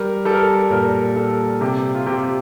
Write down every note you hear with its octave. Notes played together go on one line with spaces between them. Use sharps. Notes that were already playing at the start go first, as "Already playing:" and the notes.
Already playing: G3 A#4
G3 A4
A#4
A4
A#2 A#4
G3 A4
C3 G4
F4
C3 G4